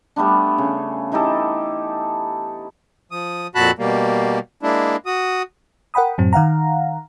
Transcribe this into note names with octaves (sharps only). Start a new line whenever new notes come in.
G3 A3 B3 D4
C#3
E3 D#4 G4 A4
F3 D#6
F2 A#2 F#4 A5 B5 F#6
B2 G3 A#3
G#3 A#3 D4 E4
F#4 D#6
A#4 F#5 G5 B5 D#6
F#2 A2 F#3 C4
D#3 F5 F#5 A#5